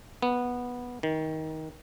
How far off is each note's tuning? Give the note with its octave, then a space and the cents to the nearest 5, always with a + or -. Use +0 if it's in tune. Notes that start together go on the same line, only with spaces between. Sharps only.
B3 -10
D#3 +20